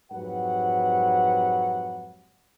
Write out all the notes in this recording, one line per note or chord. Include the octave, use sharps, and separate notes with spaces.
F2 G#2 F#3 G4 B4 F#5